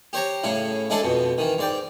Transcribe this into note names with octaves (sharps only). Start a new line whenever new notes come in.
G4 C5 C#5 A#5
A2 C#3 E4
G#3 D4 E4 G#4 A4
F2 B2
D#3 E3
G#2 D5 G5